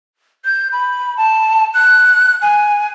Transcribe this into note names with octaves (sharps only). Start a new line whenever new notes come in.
G6
B5
A5
F#6
G#5